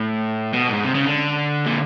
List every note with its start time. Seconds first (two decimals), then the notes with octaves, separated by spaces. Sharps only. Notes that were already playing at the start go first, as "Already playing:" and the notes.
Already playing: A2
0.54 B2
0.69 G#2
0.84 C3
0.95 C#3
1.05 D3
1.66 A#2